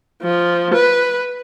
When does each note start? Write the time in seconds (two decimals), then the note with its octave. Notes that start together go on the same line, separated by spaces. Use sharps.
0.23 F3
0.74 B4